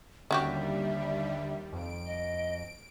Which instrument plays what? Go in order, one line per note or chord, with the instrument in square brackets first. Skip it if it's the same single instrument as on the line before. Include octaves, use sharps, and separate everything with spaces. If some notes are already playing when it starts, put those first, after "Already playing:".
[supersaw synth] D#2 G3 [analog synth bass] D3 [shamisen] C#4 F#4 G4 [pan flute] E5
[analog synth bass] F2 [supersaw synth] D7
[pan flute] D#5